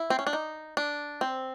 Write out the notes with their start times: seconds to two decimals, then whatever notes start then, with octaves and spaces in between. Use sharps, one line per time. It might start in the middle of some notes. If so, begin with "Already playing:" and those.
Already playing: E4
0.10 C4
0.19 C#4
0.27 D4
0.33 D#4
0.77 D4
1.21 C4